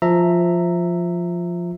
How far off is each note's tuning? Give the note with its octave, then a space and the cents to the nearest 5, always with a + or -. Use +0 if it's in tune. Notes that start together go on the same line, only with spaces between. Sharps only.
F3 +0 E5 +0 A#5 -15